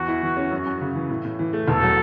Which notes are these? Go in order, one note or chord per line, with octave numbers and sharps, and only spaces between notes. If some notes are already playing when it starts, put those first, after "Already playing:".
Already playing: E2 F#4
E4
E3
C#4
F#2
F#2
C#3
E3
A2
A2
E3
A3
E1 A4
F#3